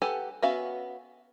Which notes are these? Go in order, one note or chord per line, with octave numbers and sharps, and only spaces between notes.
G4 A4 B4 F#5 G#5
B3 C#4 F#4 E5 F5